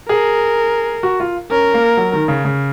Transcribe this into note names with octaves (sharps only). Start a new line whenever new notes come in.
G#4 A#4
F#4
F4
C#4 A#4
A#3
F#3
D#3
C#3
C#3